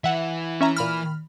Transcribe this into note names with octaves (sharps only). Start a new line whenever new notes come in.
E3 E5 F#5
C#4 E5 A#5
A#2 B5 F6